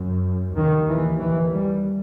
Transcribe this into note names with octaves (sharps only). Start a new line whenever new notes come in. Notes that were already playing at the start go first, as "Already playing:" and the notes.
Already playing: F#2
D#2 D#3
E3
E3
G3